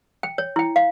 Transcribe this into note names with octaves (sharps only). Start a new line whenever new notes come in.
G5
C#5
E4 G5
F5